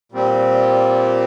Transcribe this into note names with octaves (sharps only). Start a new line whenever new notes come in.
A#2 G3 C4